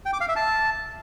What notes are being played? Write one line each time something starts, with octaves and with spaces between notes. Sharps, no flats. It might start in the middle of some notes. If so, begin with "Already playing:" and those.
G5
D6
F5
E5
A5